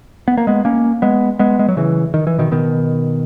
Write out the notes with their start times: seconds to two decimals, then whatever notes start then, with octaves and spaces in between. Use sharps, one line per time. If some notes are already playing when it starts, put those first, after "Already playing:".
0.28 B3
0.37 A#3
0.47 G#3 B3
0.65 A#3 C#4
1.02 G#3 B3
1.39 G#3 B3
1.59 G#3
1.68 F#3
1.77 C#3 E3
2.14 D#3
2.27 E3
2.39 B2 D#3
2.51 B2 D#3